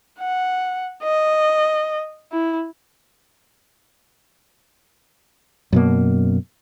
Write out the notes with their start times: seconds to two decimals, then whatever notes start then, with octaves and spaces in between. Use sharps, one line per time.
0.19 F#5
1.03 D#5
2.32 E4
5.73 F#2 B2 A#3